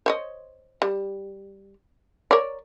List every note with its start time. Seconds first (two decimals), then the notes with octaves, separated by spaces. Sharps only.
0.06 C5 C#5 D#5
0.82 G3
2.31 A#4 C#5 D5